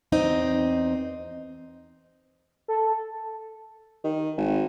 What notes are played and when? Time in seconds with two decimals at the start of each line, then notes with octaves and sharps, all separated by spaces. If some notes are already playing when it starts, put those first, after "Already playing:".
0.12 E2 C4 D#4
2.68 A4
4.04 D#3
4.38 G#1